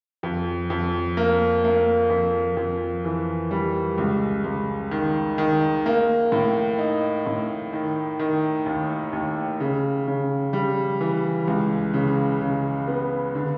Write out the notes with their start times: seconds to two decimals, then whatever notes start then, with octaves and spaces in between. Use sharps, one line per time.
0.23 F2
0.70 F2
1.17 A#3
1.64 A#3
2.10 F2
2.57 F2
3.05 E3
3.51 G3
3.98 C#2
4.44 C#2
4.91 D#3
5.38 D#3
5.86 A#3
6.32 A2
6.79 D#4
7.26 A2
7.73 D#3
8.19 D#3
8.66 D#2
9.13 D#2
9.60 C#3
10.07 C#3
10.53 G3
11.01 E3
11.48 C#2
11.94 C#3
12.41 C#3
12.87 B3
13.35 D3